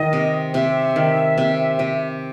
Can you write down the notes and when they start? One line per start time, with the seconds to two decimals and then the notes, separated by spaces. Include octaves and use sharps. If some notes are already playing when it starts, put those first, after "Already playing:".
Already playing: D#3 D#5
0.13 C3
0.54 C3 E5
0.96 D#3
1.38 C3
1.79 C3